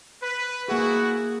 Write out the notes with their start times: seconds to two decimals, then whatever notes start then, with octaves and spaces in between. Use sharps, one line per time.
0.22 B4
0.68 A#3 E4 F#4 G#4